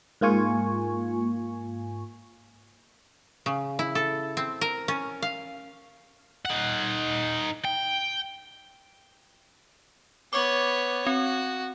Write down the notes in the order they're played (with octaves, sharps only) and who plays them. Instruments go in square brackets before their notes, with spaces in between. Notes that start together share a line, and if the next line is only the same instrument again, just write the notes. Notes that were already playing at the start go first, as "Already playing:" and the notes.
[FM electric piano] G#2 A#3 F4 G#5 C#6
[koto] C#3
E4
A4
C4
A#4
C#4
F5
[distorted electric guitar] D#4 F#5
G5
[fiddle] B3 C#5 [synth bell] C#6 D6
[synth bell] C4 [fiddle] F#4